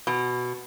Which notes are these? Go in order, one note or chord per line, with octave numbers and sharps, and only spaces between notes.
B2